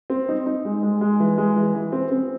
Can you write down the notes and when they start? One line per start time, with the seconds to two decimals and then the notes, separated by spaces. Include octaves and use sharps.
0.10 C4
0.29 D#4
0.46 D#4
0.65 G#3
0.83 G#3
1.01 G#3
1.20 E3
1.38 G#3
1.56 E3
1.75 E3
1.92 C4
2.11 C4